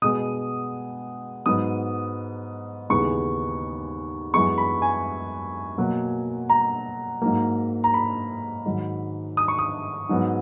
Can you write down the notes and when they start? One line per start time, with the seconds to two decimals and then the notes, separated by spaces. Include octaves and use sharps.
0.02 B2 G#3 B3 D#6
1.46 G#2 F#3 B3 D#6
2.90 D#2 C#3 E3 G#3 B3 C#6
4.34 F#2 E3 G#3 B3 C#6
4.58 B5
4.82 G#5
5.78 B2 F#3 A#3
6.49 A#5
7.22 G#2 F#3 A#3
7.84 A#5
7.94 B5
8.66 G#2 D#3 F#3
9.37 D#6
9.48 C#6
9.59 D#6
10.09 G#2 F#3 B3